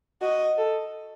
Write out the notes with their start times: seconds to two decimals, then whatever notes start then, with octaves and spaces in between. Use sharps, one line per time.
0.21 F#4 D#5
0.58 A4